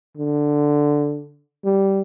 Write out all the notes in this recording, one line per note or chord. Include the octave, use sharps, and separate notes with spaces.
D3
G3